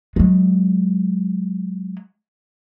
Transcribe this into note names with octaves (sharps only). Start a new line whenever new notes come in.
F#3 G#3